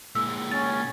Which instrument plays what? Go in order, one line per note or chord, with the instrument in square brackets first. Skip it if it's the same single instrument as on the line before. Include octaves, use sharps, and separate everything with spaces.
[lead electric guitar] A#2 G#3 [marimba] E6
[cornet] C#4 [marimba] A6